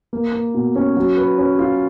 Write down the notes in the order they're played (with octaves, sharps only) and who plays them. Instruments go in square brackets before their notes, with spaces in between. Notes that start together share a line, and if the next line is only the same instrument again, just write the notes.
[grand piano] A#3
A#3
B2
C#4
F#3
B4
C#4
F4